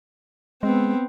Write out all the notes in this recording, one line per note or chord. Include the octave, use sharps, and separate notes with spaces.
G#3 B3 C4